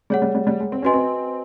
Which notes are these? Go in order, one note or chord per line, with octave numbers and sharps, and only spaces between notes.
G3 G#4 C#5 F#5
G3
G3
G3
G#3
C4
C#4 F#4 B4 D#5 G#5 C6
C4